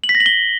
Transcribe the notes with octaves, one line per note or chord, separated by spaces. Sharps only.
F#7
B6
A#6
F#7
G7